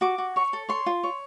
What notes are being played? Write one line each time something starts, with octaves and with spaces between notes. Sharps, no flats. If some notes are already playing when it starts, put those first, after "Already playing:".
F#4 D6
F#4
C#5 C#6
A4
C#5 C6
F4
C#5